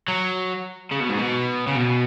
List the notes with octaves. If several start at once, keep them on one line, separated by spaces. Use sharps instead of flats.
F#3
C#3
B2
G#2
B2
C#3
B2